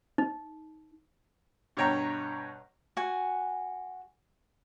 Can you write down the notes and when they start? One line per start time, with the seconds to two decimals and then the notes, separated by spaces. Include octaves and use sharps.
0.18 D#4
1.77 G2 B2 C#5 G5 A#5
2.97 F#4 G#5